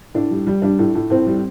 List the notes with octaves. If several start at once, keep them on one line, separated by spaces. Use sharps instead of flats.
A2 D4
G3
G3
G3 D4
A2
A2
A2 C4
G3